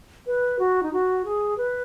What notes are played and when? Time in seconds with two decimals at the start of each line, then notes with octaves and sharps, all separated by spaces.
0.27 B4
0.59 F#4
0.83 D#4
0.93 F#4
1.25 G#4
1.58 B4